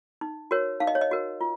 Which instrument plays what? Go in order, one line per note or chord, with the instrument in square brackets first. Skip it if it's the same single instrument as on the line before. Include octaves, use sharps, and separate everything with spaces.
[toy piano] D#4
F#4 A#4 C#5
D#4 F5
D#5
C#5
D#5
F#4 A#4
F4